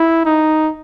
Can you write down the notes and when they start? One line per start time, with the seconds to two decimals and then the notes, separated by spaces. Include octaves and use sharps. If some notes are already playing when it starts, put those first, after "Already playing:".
Already playing: E4
0.25 D#4